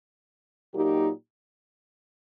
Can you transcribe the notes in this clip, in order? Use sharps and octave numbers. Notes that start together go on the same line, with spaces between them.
A#2 F#3 A#3 D#4 G4